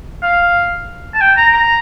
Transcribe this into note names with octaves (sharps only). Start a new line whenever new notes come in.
F5
A5
G5
A#5
A#5